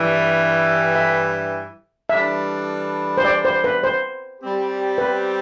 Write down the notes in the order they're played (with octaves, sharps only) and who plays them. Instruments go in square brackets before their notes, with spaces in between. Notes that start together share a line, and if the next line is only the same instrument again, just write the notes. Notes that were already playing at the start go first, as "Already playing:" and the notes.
Already playing: [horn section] G2 E3 G3
[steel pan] E5
[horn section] E3 G3 D4 A4 [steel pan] E5
[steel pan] C5
D5
C5
B4
C5
[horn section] G3 C4 G4
[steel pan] B4